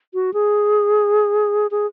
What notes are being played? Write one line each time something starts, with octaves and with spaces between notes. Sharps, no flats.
F#4
G#4
G#4